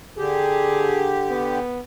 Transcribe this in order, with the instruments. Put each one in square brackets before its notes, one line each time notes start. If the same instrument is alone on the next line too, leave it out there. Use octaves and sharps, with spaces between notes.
[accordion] D3 G4 [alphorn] G#4
[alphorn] B3